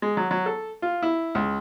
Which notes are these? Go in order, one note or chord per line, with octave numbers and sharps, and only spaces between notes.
G#3
F#3
F#3
A4
F4
E4
C#2